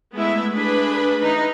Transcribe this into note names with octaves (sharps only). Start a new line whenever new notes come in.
G#3 A3 B3 E4 B4 E5
A3 D4 G#4 B4 B5
E3 D#4 B4